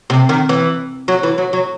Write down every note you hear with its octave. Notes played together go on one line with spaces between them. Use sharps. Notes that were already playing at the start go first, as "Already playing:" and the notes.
C3
D#3
E3
F#3
E3
F#3
F#3